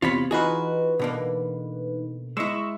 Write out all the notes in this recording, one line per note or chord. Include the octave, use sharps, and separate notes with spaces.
E2 C3 F4 C#5 B5
E3 D#4 F4 F#4 G#4 B4
B2 D3 A#3
G#3 E4 D#5 C#6 E6